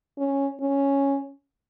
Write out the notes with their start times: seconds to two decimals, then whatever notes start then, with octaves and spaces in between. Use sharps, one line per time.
0.18 C#4
0.60 C#4